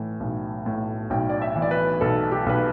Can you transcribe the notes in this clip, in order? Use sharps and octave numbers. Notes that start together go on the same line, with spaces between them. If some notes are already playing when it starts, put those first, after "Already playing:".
Already playing: A2 E3
B1
A2
B1 G5
D5
E5
E3
D5
B4
B1 A4
G4
B1 B4